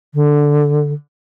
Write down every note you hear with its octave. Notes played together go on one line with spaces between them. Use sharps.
D3